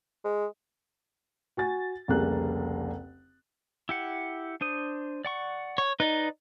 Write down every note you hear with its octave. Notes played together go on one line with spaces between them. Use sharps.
G#3
F#4 G#5 A6
F1 C2 C#3 A#3 G#4 F#6
E4 G4 F#5
D4 C5 D#6
D5 F#5 C#6
C#5
D#4 B4 D5 D#5